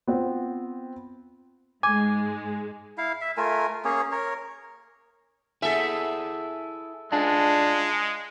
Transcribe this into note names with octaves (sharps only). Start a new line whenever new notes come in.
B3 C4 F4
G#2 G#3 G#5 D6
E4 F5
E5
A3 F4 A#4 G#5
A#3 C#4 G#4 C#5
A#4 C#5
E4 G#4 A4 E5
G#3 D4 F4 G#4